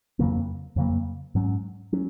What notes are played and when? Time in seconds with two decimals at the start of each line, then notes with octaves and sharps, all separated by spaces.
0.19 F2 C#3 F#3 A#3
0.76 F2 C#3 F#3 A#3
1.35 G#2 F#3 C#4
1.93 F#3 C#4